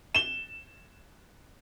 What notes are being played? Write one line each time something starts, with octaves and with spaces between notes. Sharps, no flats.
E7 G7